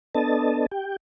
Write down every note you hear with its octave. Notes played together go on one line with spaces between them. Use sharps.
B3 D4 A4 D#5 A5
G4 G5